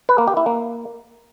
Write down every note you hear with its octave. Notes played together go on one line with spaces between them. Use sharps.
B4
A#3
G4
E4
A#3